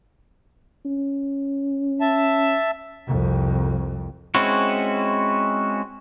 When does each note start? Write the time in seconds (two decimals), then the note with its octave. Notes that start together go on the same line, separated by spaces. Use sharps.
0.85 C#4
2.01 E5 A5
3.07 C2 F2
4.35 G#3 C4 C#4 E4 F#4